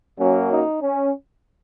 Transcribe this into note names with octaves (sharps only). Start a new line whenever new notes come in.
F#2 F#3 A#3 C#4
D#4
C#4